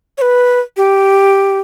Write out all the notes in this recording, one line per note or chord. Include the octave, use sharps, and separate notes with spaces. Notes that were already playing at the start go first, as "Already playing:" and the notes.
C#5
B4
G4